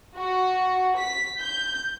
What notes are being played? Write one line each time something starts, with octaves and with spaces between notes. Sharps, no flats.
F#4
B6
G6